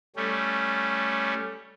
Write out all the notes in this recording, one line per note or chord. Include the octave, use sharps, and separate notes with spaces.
G3 A3 C#4